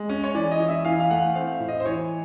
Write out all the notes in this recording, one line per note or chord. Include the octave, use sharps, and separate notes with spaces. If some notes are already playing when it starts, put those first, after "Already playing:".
Already playing: G#3
C#4
C#5
E3 D5
D#5
E3
E5
E3 F5
F5
A3 F#5
C4 F5
E5
A2
D#5
C5
E3 C#5